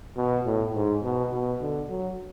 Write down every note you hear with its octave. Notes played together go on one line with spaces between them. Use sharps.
B2
A2
G#2
B2
B2
D3
F#3